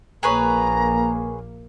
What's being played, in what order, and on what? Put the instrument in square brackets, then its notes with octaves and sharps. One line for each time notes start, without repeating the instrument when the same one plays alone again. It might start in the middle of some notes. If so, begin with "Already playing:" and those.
[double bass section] A#1 A#3 [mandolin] G#4 B4 C#5 [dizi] A#5